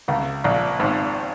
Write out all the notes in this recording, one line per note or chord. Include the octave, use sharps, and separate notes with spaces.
C#2 C#3
A#1 A#2
G#1 G#2